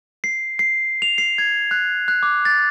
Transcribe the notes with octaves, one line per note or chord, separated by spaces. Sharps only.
C7
C7
F7
C7
G#6
F#6
F#6
D6
A6